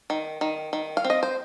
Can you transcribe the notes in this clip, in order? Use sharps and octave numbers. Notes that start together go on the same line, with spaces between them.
D#3
D#3
D#3
F5
C4
D#5
C5